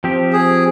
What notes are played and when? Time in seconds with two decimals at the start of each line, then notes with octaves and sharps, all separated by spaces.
0.04 F3 C4 G4
0.33 G#4